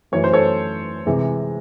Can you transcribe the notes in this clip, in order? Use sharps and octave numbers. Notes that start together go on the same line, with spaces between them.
F#2 E3 A3 C#5
C5
A4 C#5
C3 E3 G#3